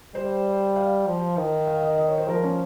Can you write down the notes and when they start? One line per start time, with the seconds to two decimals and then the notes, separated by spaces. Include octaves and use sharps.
0.15 G3 C5
0.76 F5
1.07 F3
1.37 D#3
1.67 F5
1.82 D#5
1.98 D#5
2.08 C#5
2.18 C5
2.29 F3 A#4
2.43 C#4